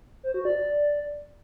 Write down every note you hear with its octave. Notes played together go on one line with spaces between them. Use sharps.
C5
F#4
D5
D5